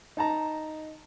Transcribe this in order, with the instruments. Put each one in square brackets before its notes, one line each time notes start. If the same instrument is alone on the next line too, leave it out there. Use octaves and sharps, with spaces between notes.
[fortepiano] D#4 A5 A#5